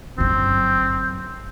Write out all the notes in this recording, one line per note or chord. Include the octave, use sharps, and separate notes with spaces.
G1 F#2 C4